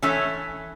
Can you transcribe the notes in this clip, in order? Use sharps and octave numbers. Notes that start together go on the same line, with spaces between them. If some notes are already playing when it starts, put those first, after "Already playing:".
E3 A3 C#4